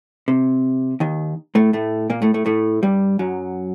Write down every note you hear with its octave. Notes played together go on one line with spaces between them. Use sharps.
C3
D#2 D#3
A2 A3
A2 A3
A#2 A#3
A2 A3
A2 A3
A2 A3
G2 G3
F#2 F#3